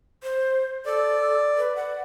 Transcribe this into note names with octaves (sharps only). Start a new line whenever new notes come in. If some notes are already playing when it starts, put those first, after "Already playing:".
C5
A4 D5
B4
F#5